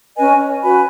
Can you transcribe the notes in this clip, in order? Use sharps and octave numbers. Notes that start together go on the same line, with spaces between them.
C#4 B4 D#5 G#5
F#4 B4 G#5 B5